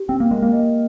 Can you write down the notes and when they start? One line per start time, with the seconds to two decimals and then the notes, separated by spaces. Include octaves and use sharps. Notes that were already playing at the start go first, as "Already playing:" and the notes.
Already playing: G4
0.09 C4 G5
0.20 A#3
0.31 G#3 A#4
0.42 A#3
0.52 D#5